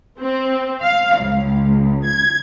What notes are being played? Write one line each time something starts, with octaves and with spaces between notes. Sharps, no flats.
C4
F5
C#2
G#6